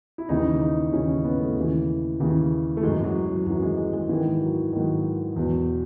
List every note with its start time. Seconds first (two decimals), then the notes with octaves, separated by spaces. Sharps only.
0.18 E4
0.29 D#2 C#3 E3 D#4
0.61 D#4
0.93 D#2 C#3 E3 C#4
1.09 C#4
1.25 B3
1.40 A3
1.56 D#2 C#3 E3
2.20 D#2 C#3 E3
2.77 A3
2.83 F#2 E3 G#3
3.04 F#3
3.25 F#3
3.46 F#2 E3 F#3
3.62 G#3
3.78 G#3
3.93 G#3
4.09 G#2 D#3 E3
4.41 F#3
4.73 G#2 D#3 F#3
5.36 E2 B2